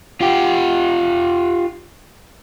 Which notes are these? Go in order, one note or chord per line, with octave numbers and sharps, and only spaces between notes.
F4 G4